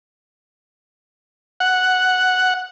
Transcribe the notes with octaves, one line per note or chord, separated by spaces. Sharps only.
F#5